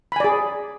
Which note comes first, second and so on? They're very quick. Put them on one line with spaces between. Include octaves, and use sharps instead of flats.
B5 G#5 D5 G#4